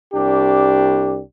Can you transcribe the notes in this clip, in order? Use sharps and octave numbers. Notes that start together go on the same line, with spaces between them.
C2 D4 G4